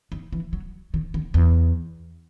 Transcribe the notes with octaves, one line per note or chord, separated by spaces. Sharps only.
D#3
E3
F#3
D#3
D#3
E2